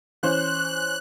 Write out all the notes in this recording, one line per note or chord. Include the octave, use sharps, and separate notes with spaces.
E3 C#4 C5 F#6